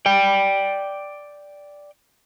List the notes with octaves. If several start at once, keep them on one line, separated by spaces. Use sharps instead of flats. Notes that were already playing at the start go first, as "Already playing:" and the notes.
D5 G5